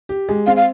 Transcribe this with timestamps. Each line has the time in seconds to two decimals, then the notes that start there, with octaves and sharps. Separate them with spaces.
0.09 G4
0.29 G#3
0.46 C4 F5
0.56 F5